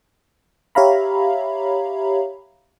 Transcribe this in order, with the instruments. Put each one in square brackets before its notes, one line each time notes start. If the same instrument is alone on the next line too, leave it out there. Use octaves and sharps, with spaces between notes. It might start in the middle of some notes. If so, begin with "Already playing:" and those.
[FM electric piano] G4 C#5 E5 F5 A#5 B5